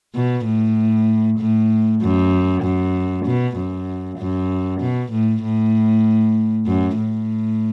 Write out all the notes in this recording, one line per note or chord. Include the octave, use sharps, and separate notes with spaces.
B2
A2
A2
F#2
F#2
B2
F#2
F#2
B2
A2
A2
F#2
A2